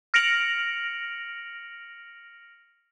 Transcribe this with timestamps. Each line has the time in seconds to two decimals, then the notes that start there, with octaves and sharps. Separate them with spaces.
0.14 F6 A#6 C#7 D7 F7 F#7